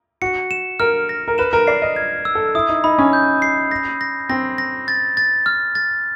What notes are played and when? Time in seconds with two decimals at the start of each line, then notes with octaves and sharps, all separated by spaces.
0.22 F#4 C#7
0.51 E7
0.80 A#4 F6
1.09 A#6
1.28 A#4
1.38 B4 E7
1.53 A#4
1.67 D5 C7
1.82 D#5
1.96 G#6
2.25 E6
2.35 A4
2.55 E4 D#6
2.69 D#4
2.84 D#4 B5
2.98 C#4
3.13 G6
3.42 C7
3.71 A#6
4.01 A#6
4.29 C4 A#6
4.58 A#6
4.88 A6
5.17 A6
5.46 F6
5.75 A6